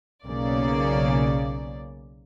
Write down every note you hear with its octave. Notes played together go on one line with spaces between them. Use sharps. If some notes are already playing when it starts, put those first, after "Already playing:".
B1 C#3 A#3 D5